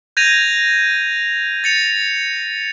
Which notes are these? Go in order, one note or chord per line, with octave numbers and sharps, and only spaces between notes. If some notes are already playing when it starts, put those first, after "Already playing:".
G6 G#6 A#6 D#7 F7
A6 C#7 F7